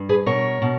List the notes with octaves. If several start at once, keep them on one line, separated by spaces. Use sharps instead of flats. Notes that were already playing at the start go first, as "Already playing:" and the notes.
Already playing: G2
G#4 B4
B2 A#4 C#5
B2